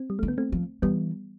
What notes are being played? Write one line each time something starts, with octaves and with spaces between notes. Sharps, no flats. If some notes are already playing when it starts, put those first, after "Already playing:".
Already playing: C4
G3
D3 A3
B3
A3 C4
F3
E3 G3 B3